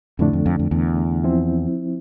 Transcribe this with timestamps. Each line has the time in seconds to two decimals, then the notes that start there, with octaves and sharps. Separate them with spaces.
0.19 F2 A2 D3 A3 D4
0.33 F2
0.46 F2
0.59 F2
0.71 E2
1.24 F3 C4 E4